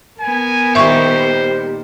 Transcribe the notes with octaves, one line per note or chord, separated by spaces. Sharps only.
B3 A#4 G#5
A#2 D#3 G3 C5 E5 C#6